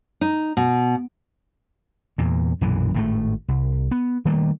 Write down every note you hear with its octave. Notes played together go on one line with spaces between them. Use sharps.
D#4
B2
E2 A#2
B1 F#2 A#2 E3
G#1 A2 C#3 A3
C2
B3
D#3 G3 A3 A#3